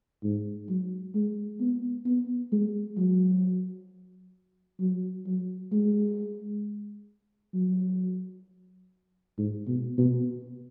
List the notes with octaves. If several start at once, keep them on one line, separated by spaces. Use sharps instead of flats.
G#2
F#3
G#3
B3
B3
G#3
F#3
F#3
F#3
G#3
F#3
G#2
B2
B2